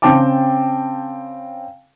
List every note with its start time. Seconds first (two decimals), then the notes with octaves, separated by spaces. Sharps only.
0.02 C#3 C4 G5 A5 D6